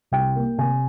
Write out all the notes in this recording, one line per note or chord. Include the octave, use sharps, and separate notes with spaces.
C2 G5
A#3
C3 G#5